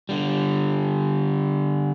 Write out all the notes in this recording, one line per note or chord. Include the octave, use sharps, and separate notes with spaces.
D3 G3